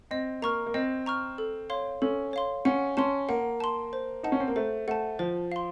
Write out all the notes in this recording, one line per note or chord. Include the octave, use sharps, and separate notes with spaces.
C4 D#5
A#3 A#5 C#6 F6
A#3
C4 D#5
A#5 C#6 F6
A4
C#5 F5 C6
C#4 A4
C#5 F5 C6
C#4 F#5
C#4 A5 C6
A#3 F#5
A5 C6
C5
D#4 F#5 A5
C#4
C4
A#3
A3 C5
A3 F#5 A5
F3 C5
F5 C6